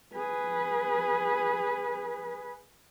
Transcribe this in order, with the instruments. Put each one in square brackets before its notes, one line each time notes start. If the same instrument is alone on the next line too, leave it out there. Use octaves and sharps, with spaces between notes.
[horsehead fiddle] G#4 B4